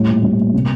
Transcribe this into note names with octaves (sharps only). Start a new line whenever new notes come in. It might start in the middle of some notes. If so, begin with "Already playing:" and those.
Already playing: A2 G3
A#2
G3
A#2
C3